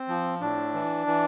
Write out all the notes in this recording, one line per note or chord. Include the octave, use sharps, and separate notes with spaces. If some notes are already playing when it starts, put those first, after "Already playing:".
Already playing: C4
F3
A2 D4
E3
E3